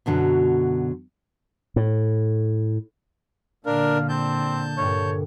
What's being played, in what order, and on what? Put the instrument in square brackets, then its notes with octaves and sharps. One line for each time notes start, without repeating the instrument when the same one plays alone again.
[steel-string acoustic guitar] F#2 B2 D3 F#3
[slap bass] A2
[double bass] A#2 D3 [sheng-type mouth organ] D4 A#4 [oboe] F5
[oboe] C4 [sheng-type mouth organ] A5 G6
[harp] G2 A#2 D3 [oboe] C#5